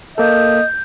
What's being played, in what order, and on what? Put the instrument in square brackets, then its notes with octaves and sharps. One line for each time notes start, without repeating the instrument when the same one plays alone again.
[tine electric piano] A#3 A4 [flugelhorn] D#5 [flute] G6